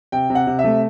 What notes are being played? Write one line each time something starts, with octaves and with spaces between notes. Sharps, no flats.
C3 G5
C3
F#5
C3
E5
A3